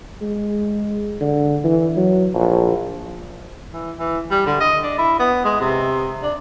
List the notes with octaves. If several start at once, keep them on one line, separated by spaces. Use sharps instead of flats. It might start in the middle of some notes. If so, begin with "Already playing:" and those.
G#3
D3
E3
F#3
A#1
E3
E3
G3
D3
D#5
D4
E4
B3
G#3
C3
D4